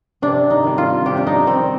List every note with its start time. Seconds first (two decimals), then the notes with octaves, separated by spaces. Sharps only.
0.22 C3 D4
0.50 D#4
0.64 D#3 G3
0.78 F4
1.06 C3 G4
1.17 D4
1.27 D#4
1.47 D#3 G3 C4